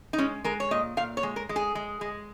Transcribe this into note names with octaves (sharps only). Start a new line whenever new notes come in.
D#4
G#3 C#4
G#3 A#4
C#5
A#2 D#5
A#2 F5
C#5
G#3
A#4
G#3
G#4
G#3
G#3